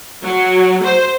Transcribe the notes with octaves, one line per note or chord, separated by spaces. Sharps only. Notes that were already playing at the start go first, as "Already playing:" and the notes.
F#3
C5